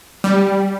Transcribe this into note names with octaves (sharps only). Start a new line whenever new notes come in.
G3